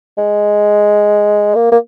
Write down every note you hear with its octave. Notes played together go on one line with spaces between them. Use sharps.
G#3
A#3
A#3